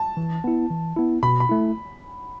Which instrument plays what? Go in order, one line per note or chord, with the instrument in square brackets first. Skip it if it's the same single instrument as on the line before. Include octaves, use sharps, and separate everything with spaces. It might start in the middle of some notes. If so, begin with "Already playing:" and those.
Already playing: [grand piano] A5
[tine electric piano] E3
B3 E4
E3
B3 E4
[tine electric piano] B2 [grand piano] B5
[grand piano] B5
[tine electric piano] A3 E4